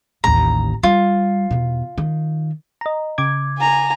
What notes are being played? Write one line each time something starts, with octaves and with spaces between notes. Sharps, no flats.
A1 D#2 A#5
G3 F4
E2 B2
D#3
D#5 A#5
C#3 D6 G#6
G#5 A#5